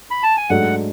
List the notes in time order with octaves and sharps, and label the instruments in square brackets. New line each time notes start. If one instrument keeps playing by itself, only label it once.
[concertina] B5
A5
G#5
[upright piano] G#2 F#3 A3 D4 A4 [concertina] F#5